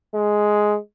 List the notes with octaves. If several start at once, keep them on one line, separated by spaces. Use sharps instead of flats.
G#3